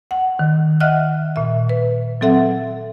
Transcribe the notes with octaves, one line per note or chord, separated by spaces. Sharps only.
F#5
D#3
D#5 E5 F#5 F6 F#6
A#2 E5
B4
F#3 C4 A4 E5 F#5